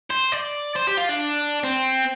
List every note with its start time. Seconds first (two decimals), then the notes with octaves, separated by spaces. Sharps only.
0.10 C5
0.32 D5
0.76 C5
0.87 G4
0.98 F4
1.09 D4
1.64 C4